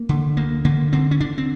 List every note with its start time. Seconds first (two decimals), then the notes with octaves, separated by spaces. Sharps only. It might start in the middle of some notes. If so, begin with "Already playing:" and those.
Already playing: A#3
0.09 D3
0.37 D2 A#3
0.65 D3 A#3
0.93 D3 C4
1.11 C#4
1.20 D3 D4
1.38 C4